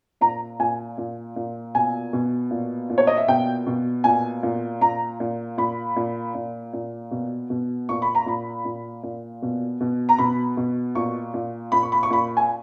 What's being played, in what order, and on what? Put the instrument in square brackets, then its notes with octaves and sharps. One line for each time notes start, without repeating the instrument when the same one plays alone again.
[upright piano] A#2 A#5
A#2 G#5
A#2
A#2
B2 G#5
B2
A#2
A#2
C#5
D#5
E5
B2 G5
B2
A#2 G#5
A#2
A#2 A#5
A#2
A#2 B5
A#2
A#2
A#2
B2
B2
A#2 C#6
B5
A#5
A#2 B5
A#2
A#2
B2
B2
A#5
B2 B5
B2
A#2 C#6
A#2
A#2 B5
C#6
B5
C#6
A#2 B5
G#5